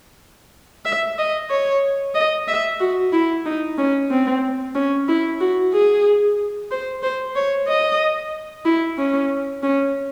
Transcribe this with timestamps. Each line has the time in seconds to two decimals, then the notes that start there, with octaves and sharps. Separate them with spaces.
0.85 E5
1.18 D#5
1.50 C#5
2.15 D#5
2.48 E5
2.80 F#4
3.12 E4
3.45 D#4
3.78 C#4
4.11 C4
4.75 C#4
5.08 E4
5.40 F#4
5.73 G#4
6.71 C5
7.03 C5
7.35 C#5
7.67 D#5
8.65 E4
8.98 C#4
9.63 C#4